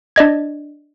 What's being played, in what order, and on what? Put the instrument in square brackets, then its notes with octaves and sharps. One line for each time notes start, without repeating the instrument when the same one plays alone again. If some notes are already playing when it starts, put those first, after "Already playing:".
[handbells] D4 D5 D#5 G#6